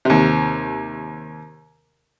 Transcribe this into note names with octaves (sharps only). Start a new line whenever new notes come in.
D#2 C3